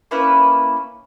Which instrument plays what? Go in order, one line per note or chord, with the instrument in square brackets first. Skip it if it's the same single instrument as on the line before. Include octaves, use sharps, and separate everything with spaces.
[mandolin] A#3 C#4 E4 B4